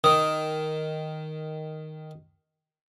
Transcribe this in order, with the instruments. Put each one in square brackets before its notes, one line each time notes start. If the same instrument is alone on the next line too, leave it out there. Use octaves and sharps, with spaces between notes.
[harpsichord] D#3 [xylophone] D#6